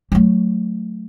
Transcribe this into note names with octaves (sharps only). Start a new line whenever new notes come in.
F#3 A3